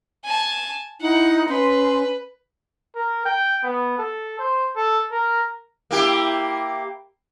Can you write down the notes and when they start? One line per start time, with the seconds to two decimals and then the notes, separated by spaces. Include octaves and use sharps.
0.24 G#5 A5
1.01 D#4 E4 F#5
1.49 C#4 B4 C6
2.95 A#4
3.25 G5
3.63 B3
3.98 A4
4.39 C5
4.76 A4
5.11 A#4
5.91 A#3 E4 G4